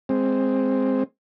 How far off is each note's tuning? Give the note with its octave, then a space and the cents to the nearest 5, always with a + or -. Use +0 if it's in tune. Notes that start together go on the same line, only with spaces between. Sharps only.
G#3 -5 C4 +0